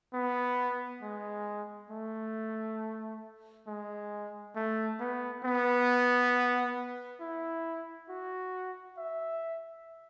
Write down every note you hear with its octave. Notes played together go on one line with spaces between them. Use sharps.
B3
G#3
A3
G#3
A3
B3
B3
E4
F#4
E5